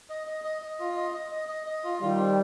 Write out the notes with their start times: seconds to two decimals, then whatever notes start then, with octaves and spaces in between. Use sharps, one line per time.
0.10 D#5
0.27 D#5
0.44 D#5
0.62 D#5
0.80 F4
0.97 D#5
1.14 D#5
1.32 D#5
1.49 D#5
1.67 D#5
1.84 F4
2.01 D#3 G3 F4
2.19 C4